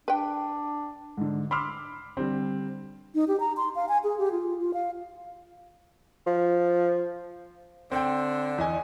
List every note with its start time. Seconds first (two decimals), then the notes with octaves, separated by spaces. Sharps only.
0.08 D4 B4 G5
1.17 G#2 D3
1.51 B5 C6 D6 E6 F6
2.17 D3 G3 C4
3.15 D#4
3.28 G4
3.40 A#5
3.57 C6
3.76 F5
3.89 G#5
4.04 G#4
4.18 G4
4.32 F4
4.59 F4
4.74 F5
6.27 F3
7.92 D3 C4 G5
8.58 E2 D#5 G#5